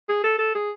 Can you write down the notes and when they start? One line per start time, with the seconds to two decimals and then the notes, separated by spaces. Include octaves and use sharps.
0.09 G#4
0.24 A4
0.39 A4
0.55 G#4